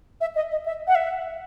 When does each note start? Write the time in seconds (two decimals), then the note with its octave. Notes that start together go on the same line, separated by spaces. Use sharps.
0.21 E5
0.35 D#5
0.51 D#5
0.66 E5
0.87 F#5
0.95 E5